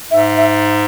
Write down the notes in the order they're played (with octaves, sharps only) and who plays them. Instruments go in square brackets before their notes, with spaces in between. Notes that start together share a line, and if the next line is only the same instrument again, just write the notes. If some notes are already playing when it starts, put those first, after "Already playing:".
[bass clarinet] G#2 [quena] E5
[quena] E5